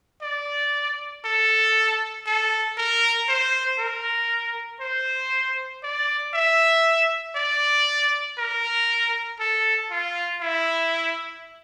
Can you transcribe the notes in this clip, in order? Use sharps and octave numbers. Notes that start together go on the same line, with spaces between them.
D5
A4
A4
A#4
C5
A#4
C5
D5
E5
D5
A#4
A4
F4
E4